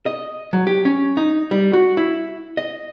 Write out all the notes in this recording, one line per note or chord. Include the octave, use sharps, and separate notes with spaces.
D#5
F#3
G4
C#4
D#4
G3
F#4
E4
D#5